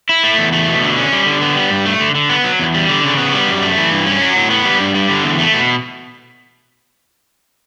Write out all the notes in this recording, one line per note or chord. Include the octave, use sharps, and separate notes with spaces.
E4
A3
E2
A3
B2
D3
C#4
G3
D3
B3
G3
G2
A3
D3
D3
B3
F#3
E2
G3
D3
C#3
B3
G3
F#2
A3
E3
G2
C#4
F#3
A2
B3
G3
G2
G3
D3
E2
A3
B2